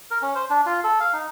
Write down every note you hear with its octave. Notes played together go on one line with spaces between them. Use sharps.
A#4
C#4
C5
D4
F4
A4
F5
D#4